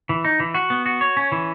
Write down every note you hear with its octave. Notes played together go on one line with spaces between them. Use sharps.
E3
D#4
E3
F#4
B3
F#4
C#5
C#4
E3